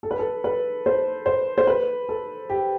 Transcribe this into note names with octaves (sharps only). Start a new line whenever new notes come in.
A4
B4
A4
B4
C5
C5
C5
B4
A4
G4